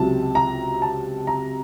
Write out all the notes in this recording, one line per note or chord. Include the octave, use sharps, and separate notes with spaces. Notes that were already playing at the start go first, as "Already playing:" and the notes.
Already playing: C#2 C3 F#3 A5
A#5
A5
A#5